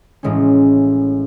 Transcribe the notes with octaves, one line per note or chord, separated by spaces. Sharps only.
A1 A2 G#3 C#4